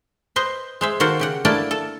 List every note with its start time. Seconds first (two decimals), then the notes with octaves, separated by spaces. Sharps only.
0.36 B4 C5 D#5
0.81 G#3 C5 E5
1.00 D#3 A#3 F#4 A4 C5 F#5
1.19 C#3 G4 F#5
1.45 A3 A#3 D4 E4 D5 A5
1.71 A4